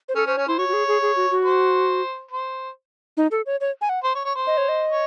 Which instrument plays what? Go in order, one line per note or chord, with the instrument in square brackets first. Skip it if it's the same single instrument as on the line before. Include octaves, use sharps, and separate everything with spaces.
[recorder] C5
[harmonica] C#4 [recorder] A4
[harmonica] C#4 [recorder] C5
[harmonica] C#4 [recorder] C#5
[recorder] E4 [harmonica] C5
[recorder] F#4 [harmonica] C#5
[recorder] F#4
G#4
G#4
G#4
F#4
F#4
[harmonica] C5
C5
[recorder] D#4
A4
C#5
C#5
G#5
F#5
[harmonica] C5
C#5
C#5
C5
[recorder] D#5
C#5
D#5
[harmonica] C#5